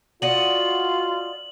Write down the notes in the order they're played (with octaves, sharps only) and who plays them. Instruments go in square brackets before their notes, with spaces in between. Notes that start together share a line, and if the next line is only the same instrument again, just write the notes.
[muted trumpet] F4 [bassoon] F#4 [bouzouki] D5 D#5 F#5 [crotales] F#7